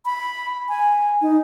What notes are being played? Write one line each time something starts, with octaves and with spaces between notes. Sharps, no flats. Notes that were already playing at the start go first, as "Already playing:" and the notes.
B5
G#5
D#4